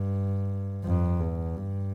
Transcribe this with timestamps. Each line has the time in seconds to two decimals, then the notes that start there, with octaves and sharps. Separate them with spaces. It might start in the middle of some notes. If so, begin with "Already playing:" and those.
Already playing: G2
0.84 F2
1.20 E2
1.57 G2